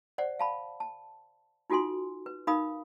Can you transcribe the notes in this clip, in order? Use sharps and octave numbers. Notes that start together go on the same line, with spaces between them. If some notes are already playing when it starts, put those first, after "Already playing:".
C5 D5 F#5
F5 A5 B5
A5
D#4 F4 F#4 A4 G#5 C6
B4
D#4 A#4 F5 B5 D#6